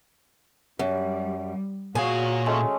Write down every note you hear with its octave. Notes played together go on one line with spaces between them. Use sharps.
F#2 G3
A#2 F#4 G#4 C#5 F5 G#5
G#3 A3 C#4